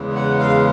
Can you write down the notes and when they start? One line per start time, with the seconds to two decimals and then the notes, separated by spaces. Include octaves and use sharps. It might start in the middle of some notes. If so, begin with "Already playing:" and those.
Already playing: E2 C#3 E3 G#3
0.15 F#5
0.39 F5